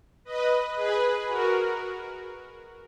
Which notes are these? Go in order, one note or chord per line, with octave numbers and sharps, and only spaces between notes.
B4 D#5
G#4 B4
F#4 A#4